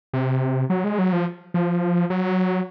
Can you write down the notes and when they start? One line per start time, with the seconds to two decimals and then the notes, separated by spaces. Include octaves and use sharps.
0.13 C3
0.70 F#3
0.84 G#3
0.99 F#3
1.13 F3
1.54 F3
2.10 F#3